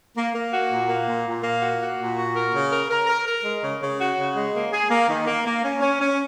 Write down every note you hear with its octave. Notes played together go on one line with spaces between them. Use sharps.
A#3
A#3
F#4
A#2
A#3
A#2
A#2
A#3
F#4
F#4
A#2
F#4
A#4
C#3
A#4
A#4
A#4
A#4
G#3
C#3
C#3
F#4
C#3
G#3
A#3
G#4
A#3
D#3
A#3
A#3
C#4
C#4
C#4